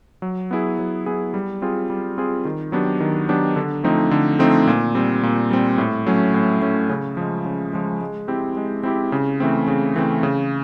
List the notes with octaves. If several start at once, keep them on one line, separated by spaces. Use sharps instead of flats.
F#3
B3 E4 G#4
F#3
B3 E4 G#4
G3
C4 F4 G#4
G3
C4 F4 G#4
D#3
F#3 B3 D4 G4
D#3
F#3 B3 D4 G4
D3
F3 A3 C4 D#4
D3
F3 A3 C4 D#4
A#2
G3 C4
A#2
G3 C4
A2
F#3 A3 C#4
A2
F#3 A3 C#4
C#3
F3 G#3
C#3
F3 G#3
G#3
C4 E4 G4
G#3
C4 E4 G4
C#3
E3 A3 C4
C#3
E3 A3 C4
C#3